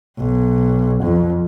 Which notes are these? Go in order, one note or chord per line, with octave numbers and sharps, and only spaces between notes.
B1
F2